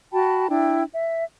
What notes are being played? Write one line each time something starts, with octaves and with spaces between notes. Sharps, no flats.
F#4 G5 A5 B5
D4 E4 G5
E5